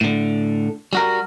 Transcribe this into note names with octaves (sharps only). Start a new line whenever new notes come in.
A2 D3
G3 F#4 A#4